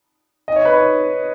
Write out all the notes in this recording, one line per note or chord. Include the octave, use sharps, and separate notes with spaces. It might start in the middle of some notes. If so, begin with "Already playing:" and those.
D#5
C#5
B4
C#5